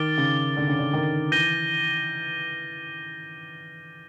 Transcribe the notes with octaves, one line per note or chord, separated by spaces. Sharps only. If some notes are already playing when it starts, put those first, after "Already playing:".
Already playing: D#3 D6 F6 A6 D7 G7
C#3
D3
C#3
D3
D#3
E3 G6 A#6 D#7 G7